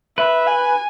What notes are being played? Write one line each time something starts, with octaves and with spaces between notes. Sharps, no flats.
B4 E5
G#5